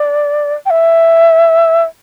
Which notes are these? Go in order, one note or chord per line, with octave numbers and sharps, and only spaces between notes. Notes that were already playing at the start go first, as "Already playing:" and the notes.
Already playing: D5
G5
E5